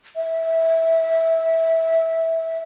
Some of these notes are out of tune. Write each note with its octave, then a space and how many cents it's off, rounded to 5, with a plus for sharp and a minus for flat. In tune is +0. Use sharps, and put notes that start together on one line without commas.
E5 -15